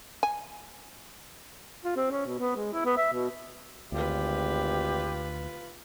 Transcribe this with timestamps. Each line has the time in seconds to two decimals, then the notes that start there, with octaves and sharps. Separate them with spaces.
0.23 G#5
1.84 F4
1.96 C4
2.11 C#4
2.26 B2
2.39 B3
2.56 G#3
2.73 E4
2.85 B3
2.97 E5
3.12 B2
3.92 G#1 D2 F4 G4 B4